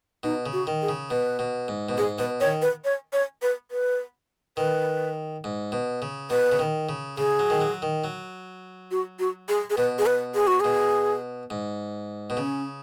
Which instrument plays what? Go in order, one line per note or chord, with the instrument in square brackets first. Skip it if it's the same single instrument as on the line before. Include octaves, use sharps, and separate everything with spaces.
[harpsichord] B2 [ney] D#4
[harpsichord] C#3
[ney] F#4
[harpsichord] D#3
[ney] G#4
[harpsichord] C#3
[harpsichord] B2 [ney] B4
[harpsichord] B2
G#2
B2
[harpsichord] G#2 [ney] G#4
[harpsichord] B2 [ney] B4
[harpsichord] D#3 [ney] C#5
[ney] B4
C#5
C#5
B4
B4
[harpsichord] D#3 [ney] B4
[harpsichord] G#2
B2
C#3
[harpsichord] B2 [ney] B4
[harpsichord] C#3
D#3
C#3
[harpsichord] C#3 [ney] G#4
[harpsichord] F#3
D#3
F#3
D#3
F#3
[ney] F#4
F#4
G#4
G#4
[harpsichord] B2 [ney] B4
[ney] G#4
B4
G#4
F#4
[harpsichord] B2 [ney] G#4
[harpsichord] G#2
B2
[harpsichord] C#3 [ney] C#4